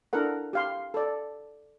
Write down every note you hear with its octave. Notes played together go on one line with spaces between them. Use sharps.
D4 E4 A4 A#4 F#5
G4 F5 C6
A4 D5